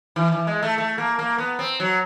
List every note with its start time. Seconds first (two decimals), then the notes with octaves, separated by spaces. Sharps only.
0.16 E3
0.32 E3
0.47 G#3
0.62 A3
0.78 A3
0.98 A#3
1.19 A#3
1.38 B3
1.59 C4
1.80 F#3